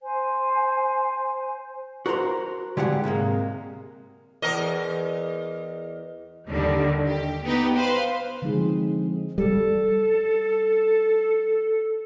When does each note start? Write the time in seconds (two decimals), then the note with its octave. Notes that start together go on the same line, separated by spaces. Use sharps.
0.01 C5 G#5
2.06 F#4 A#4 C5 A#5 C6
2.77 D3 G#3 G4 G#4 D#5 F#5
3.04 G#2 C3 G#3 A#3
4.42 E2 A#4 D#5
6.48 D#2 D3 D#3 G3
7.07 G4
7.43 B3 D#4 G4 B4
7.76 B4 C5 F5
8.42 D3 F3 G#3 C4 D#4 G#4
9.38 G3 A4